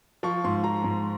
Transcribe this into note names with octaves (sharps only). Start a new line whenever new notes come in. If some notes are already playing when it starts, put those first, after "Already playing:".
F3 C#6
G#2 C6
F3 A#5
G#2